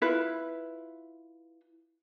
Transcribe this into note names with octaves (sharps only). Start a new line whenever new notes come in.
E4 F4 B4